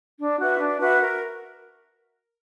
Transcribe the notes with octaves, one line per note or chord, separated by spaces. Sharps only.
D4
F#4 B4 E5
D4
F#4 B4 E5
A#4